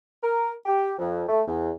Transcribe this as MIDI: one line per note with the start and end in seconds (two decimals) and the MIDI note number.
0.23 0.52 70
0.66 0.92 67
0.99 1.23 41
1.29 1.41 57
1.47 1.70 40